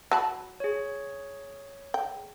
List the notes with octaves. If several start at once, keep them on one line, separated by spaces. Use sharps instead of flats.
F#3 A5 B5
G#4 C#5
G5